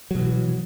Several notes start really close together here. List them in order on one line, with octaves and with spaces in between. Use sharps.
F#3 B2 E3